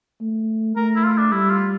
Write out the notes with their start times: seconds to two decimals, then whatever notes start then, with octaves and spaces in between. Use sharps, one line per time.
0.21 A3
0.76 A3 A#4
0.96 E4
1.04 F4
1.18 D4
1.32 G3 E4
1.50 F4